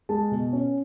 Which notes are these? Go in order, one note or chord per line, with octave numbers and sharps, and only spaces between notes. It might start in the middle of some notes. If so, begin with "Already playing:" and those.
G#3 A5
B2
C#4